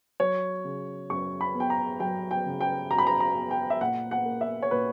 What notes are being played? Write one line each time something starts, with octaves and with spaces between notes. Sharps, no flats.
F#3 C#5
C#3
F#2 C#6
B5
B3
G5
A#5
F#3 G5
G5
C#3
G5
F#2 A#5
B5
A#5
A#5
B3
G5
E5
A#2 F#5
F#5
A#3
E5
C#5
A#2 B4